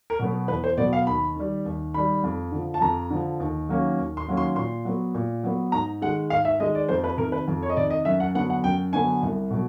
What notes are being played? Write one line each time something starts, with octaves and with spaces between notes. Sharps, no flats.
A#4
B2 F#3 B3
E2 B4
C5
B2 F#3 B3 D5
F5
D#2 B5
D#3 G3
D#2
D#3 G3 B5
F2
D3 F3
A5
F2 A#5
D3 F3
D#2
D#3 F#3 A#3 C#4
D#2
C6
D#3 F#3 A#3 C#4
C6
A#2 C6
F#3 B3
A#2
F#3 B3
G#2 A#5
D#3 G#3 F#5
G#2 F5
E5
D#3 G#3 D#5
D5
F2 C5
B4
C3 D#3 A#4
B4
F2
C#5
D#5
C3 D#3 D5
D#5
F#2 E5
F#5
D3 F#3 B3 F#5
F#5
F#2 G5
D3 F#3 B3 G#5
C2
B2 F#3